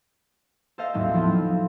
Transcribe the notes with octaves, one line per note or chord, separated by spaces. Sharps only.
A4 C5 D#5 F5
D#2 A2 F#3 C4
F3 B3 C4